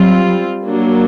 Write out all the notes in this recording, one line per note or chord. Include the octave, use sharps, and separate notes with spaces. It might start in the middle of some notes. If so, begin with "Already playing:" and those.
Already playing: F#3 G3 C4 F4
F#3 A#3 D4